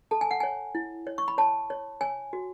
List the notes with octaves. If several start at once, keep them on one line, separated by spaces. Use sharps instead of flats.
A4 A5
G#5
F#5
C#5 G#5
E4
C#5
C#6
B5
C#5 A5
C#5
C#5 G#5
F#4